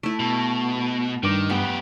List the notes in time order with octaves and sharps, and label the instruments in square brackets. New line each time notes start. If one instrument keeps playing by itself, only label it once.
[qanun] A3 E4
[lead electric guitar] B2
[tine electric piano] G2 D6 [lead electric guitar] D#3
[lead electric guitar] F#2 G4 [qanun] B3